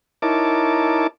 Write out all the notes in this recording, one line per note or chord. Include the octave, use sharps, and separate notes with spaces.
D#4 E4 A#4 C#5 A5 D6